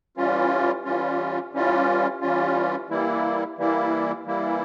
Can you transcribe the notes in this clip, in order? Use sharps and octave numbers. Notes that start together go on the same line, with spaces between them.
E3 G3 C#4 F4
E3 G3 C#4 F4
E3 G3 C#4 F4
E3 G3 C#4 F4
E3 G3 A#3 E4
E3 G3 A#3 E4
E3 G3 A#3 E4